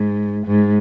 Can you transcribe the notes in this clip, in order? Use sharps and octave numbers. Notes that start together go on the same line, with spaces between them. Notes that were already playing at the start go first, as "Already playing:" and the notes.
Already playing: G#2
G#2